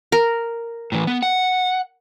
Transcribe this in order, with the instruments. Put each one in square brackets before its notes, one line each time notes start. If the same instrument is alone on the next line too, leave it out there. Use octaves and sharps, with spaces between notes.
[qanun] A#4
[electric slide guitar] A2 E3
B3
F#5